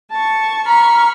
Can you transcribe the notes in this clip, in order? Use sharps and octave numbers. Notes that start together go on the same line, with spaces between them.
A5 C#6
A#5 B5 C#6 F6